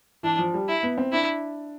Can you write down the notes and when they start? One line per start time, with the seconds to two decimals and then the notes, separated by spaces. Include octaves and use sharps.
0.23 E3 D4
0.38 F3
0.54 G3
0.69 E4
0.83 B3
0.98 C4
1.12 D4 E4